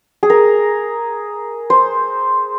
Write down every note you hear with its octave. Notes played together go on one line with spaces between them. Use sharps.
G#4
A#4
C5